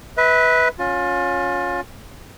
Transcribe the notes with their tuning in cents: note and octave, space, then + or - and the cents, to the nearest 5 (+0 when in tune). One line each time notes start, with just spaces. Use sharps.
B4 +0 E5 -40
C#4 +0 F4 +30